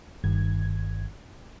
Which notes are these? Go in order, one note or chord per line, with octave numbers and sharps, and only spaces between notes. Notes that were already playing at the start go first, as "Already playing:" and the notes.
G1 G2 D#3 G#6